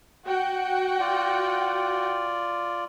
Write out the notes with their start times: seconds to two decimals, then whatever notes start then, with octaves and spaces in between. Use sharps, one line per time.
0.25 F#4 F#5 G5
1.00 F4 D5